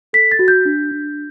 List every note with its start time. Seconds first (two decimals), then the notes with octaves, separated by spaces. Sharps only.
0.13 A4 B6
0.31 A6
0.39 F#4
0.48 G6
0.65 D4
0.91 D4